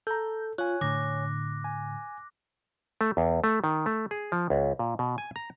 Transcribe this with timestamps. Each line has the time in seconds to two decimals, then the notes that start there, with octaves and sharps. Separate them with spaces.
0.07 A4 A#5 G6
0.58 F4 C#5 G#5 F#6
0.81 A2 D3 D6 A#6
1.64 G#5
3.01 A3
3.17 E2
3.44 A3
3.64 D#3
3.86 A3
4.11 G#4
4.32 F3
4.50 C#2
4.79 A#2
4.99 B2
5.18 G#5
5.36 A#5